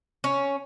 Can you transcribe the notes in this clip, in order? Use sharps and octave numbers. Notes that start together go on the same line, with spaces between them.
C#4